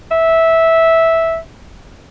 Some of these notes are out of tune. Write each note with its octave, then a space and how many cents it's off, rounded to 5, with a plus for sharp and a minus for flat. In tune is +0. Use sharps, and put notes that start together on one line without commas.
E5 -10